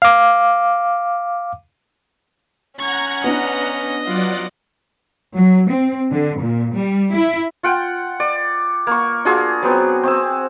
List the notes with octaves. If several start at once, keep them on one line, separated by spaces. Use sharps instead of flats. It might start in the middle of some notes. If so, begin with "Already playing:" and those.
F5 D6
C#4 F#5 A#5 C#6 G#6
B3 D4 D#5
F#3 F4 D5 F#5
F#3
C4
D3
A#2
G3
E4
F4 F#5 G5
D5
A#3 C#6
D4 F4 F#4 G#4
F#3 B3 C4
C4 D#6 E6